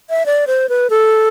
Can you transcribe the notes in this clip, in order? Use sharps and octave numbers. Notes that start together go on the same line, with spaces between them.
E5
D5
C5
B4
A4